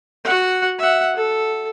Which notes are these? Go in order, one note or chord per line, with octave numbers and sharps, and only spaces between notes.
F#4 F#5
E5 F#5
A4